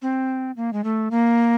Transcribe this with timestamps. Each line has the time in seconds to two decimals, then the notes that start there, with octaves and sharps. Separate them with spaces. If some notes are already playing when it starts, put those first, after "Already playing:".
0.02 C4
0.57 A#3
0.73 G#3
0.84 A3
1.11 A#3